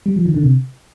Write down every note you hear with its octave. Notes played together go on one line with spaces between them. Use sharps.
G3
F3
D#3
D3
C3